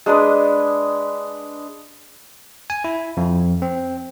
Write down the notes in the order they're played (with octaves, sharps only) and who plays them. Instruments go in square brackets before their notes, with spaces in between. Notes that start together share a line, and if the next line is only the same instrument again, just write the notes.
[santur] G#3 D4 B4 D#6
[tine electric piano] G#5
E4
F2
C4